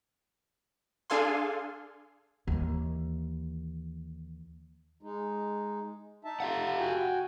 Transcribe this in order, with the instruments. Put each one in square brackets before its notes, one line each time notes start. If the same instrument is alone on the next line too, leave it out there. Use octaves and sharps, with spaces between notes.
[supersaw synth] D4 G#4 A4 F5 G#5 C6
[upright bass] D#2 E3
[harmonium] G#3 D#4
D#4 E5 A5
[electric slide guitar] G4 F5 F#5
[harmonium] F#4 G5 G#5